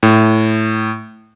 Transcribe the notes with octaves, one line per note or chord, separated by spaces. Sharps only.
A2